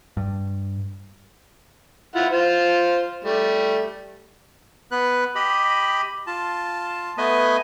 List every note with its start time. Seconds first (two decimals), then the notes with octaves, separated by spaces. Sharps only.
0.17 G2
2.15 E4 F4 F#5
2.32 F4 C5
3.24 G3 A3
4.91 B3 B4 F#6
5.35 G4 D#5 B5
6.27 F4 A5
7.18 A3 B3 B4 D#5 G#5